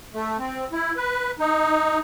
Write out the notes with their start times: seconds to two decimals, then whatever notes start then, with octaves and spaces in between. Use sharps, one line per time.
0.14 A3
0.38 C4
0.72 E4
0.96 B4
1.39 D#4